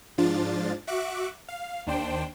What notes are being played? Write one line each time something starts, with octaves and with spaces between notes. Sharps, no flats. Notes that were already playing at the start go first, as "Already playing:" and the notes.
G#2 F3 D4 F4 A6
F#4 E5 C#6 D6 F#6
F5
D#2 D4 C5 G5